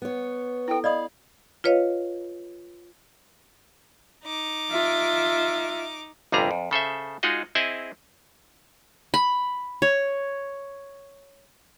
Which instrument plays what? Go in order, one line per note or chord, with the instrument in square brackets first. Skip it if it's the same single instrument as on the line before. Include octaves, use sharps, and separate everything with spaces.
[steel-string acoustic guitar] B3 C#5
[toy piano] E4 A4 [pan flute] G5
[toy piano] D5 D#5 D#6 [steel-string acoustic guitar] F5 [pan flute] B5
[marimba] F4 B4 C#5 D#5 F5
[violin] D#4 D6
[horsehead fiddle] F4 E5
[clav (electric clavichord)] G1 F2 C3 G3 G#4 A#5
F2
C#3 A4 C5 E5
G#3 D#4 F4 F#4 G#4 D#5
C4 E4 G#4 D#5 E5
[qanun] B5
C#5